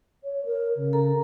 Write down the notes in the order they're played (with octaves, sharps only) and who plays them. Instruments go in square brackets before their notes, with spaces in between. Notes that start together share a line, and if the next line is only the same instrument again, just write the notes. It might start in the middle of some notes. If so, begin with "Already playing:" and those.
[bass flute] C#5
A#4
C#3
[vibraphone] A4 A#4 A#5